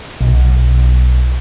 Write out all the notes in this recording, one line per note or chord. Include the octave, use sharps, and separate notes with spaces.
B1